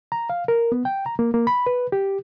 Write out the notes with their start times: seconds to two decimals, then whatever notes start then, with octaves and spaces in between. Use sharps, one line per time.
0.12 A#5
0.30 F5
0.48 A#4
0.72 B3
0.85 G5
1.06 A#5
1.19 A#3
1.34 A#3
1.47 B5
1.66 B4
1.92 G4